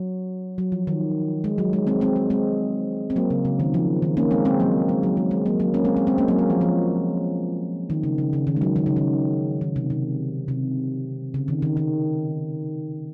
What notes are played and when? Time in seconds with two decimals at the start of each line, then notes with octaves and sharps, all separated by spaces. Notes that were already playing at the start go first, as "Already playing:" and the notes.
Already playing: F#3
0.58 F#3
0.72 F3
0.87 D#3
1.44 G#3
1.58 F#3
1.73 G#3
1.87 G#3 C4
2.01 G#3 C4
2.16 G#3
2.30 G#3 C4
3.10 C4
3.16 F#3 A#3
3.30 C#3
3.45 C#3
3.60 D#3
3.74 F3
4.02 D#3
4.17 A#3 C#4
4.31 G#3 C4
4.45 G#3 C4
4.60 F#3 A#3
4.89 G#3
5.03 F#3
5.17 G#3
5.31 G#3
5.46 F#3 A#3
5.60 F#3 A#3
5.74 A#3 C#4
5.85 G#3 C4
5.97 G#3 C4
6.07 G#3 C4
6.18 A#3 C#4
6.28 F#3 A#3
6.38 G#3
6.50 F3
6.61 F3
7.90 D#3
8.03 C#3
8.18 C#3
8.33 C#3
8.47 D#3
8.56 G#3
8.62 F#3
8.76 D#3
8.86 C#3
8.96 D#3
9.61 D#3
9.76 C3
9.90 C3
10.48 C3
11.34 C#3
11.48 D#3
11.62 D#3
11.77 D#3